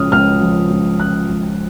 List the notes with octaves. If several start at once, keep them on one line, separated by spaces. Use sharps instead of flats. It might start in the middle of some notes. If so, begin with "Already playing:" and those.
Already playing: C#2 C#3 F3 D#6 F6
C#2 F6
F3
C#2
C#3 F#6
C#2